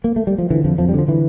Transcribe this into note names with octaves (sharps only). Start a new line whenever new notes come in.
A#3
A3
G3
F3
D3 E3
F2 F3
F2 F3
G3
D3 F3
D3 E3